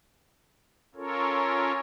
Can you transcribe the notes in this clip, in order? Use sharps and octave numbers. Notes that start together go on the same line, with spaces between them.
C#4 F4 A4 A#4 C#5